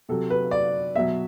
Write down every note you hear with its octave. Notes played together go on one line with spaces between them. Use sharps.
C3 F#3 A4
B4
D5
B2 F#3 E5